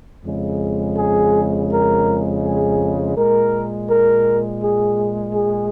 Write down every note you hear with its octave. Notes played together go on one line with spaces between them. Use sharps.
F2 C#3 G#3
G#4
A#4
G#4
A#2 G#3 A#4
A#4
G#4
G#4